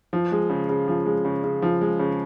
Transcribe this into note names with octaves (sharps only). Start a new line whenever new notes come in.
F3
G#3
C#3
C#3
F3
G#3
C#3
C#3
F3
G#3
C#3